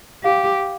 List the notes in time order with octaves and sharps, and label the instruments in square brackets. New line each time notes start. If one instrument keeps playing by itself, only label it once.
[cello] G4 [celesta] F5